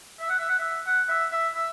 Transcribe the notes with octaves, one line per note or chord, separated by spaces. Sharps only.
E5
F#5
E5
F#5
E5
F#5
E5
E5
E5